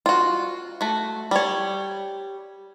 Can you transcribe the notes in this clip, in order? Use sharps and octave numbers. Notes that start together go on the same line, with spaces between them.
F4 F#4
A3 F#4
G3 C#5